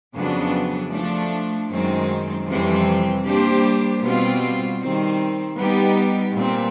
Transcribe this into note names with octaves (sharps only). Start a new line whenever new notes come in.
F2 C#3 F#3 B3 D4
F3 A3 D4
F#2 D#3 G#3 C4
F2 C3 E3 G3 C4
G3 A#3 D4 G4 C5
B2 G3 C4 F4
D#3 G3 C4
G3 B3 D#4 G4
A#2 G3 C4